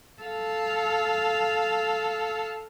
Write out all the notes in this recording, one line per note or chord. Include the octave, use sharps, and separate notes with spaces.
A4 F5